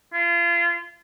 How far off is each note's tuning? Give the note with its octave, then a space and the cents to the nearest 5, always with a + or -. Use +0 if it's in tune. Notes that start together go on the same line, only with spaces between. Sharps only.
F4 -30